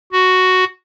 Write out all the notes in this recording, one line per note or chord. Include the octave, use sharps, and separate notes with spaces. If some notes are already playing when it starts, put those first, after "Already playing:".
F#4